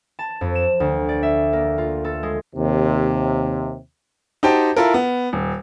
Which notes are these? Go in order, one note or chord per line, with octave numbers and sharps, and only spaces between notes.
A5
F2
E7
D2
D5
E5
A#3
F4
A4
G#3
D#2 C3
D#4 F#4 G4 C5 G5 A5
E4 F4 A4 A#4
B3
D#1